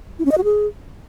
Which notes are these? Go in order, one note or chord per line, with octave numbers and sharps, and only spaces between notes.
E4
C#4
D#5
F#4
G#4